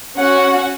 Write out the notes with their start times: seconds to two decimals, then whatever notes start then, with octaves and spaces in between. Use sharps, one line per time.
0.17 C#4 F#4 F#5